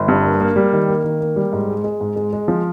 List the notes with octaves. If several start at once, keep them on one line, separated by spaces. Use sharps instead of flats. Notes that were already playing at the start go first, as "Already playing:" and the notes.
Already playing: G1
G2
A#3
A#3
G3
D#3
A#3
D#3
A#3
G3
G#2
G#3
G#3
G#2
G#3
G#3
F3